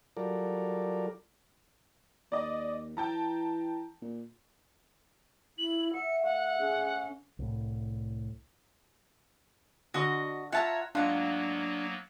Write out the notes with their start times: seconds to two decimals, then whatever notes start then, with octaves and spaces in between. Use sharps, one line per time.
0.17 F#3 G3 F4 A4 A#4 D5
2.32 D#2 D5 D#5
2.97 E3 G5 A5 A#5
4.02 A#2
5.58 E4 F#7
5.94 E5 F#5 C#7
6.23 A3 F5 F#5
6.58 C#4 G#4
7.39 C2 A2
9.94 D3 F#4 D#5
10.52 F4 C#5 E5 F#5 A5 A#5
10.95 G#2 F#3 A#3 B3 D4 F4 F#5